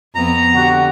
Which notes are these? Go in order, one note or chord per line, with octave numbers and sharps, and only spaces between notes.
F2 B3 A#5
D3 F#4 G4